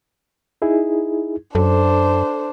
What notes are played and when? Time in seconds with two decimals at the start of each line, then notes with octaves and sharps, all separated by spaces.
0.62 D#4 E4 G#4
1.55 F#2 D4 A4 C5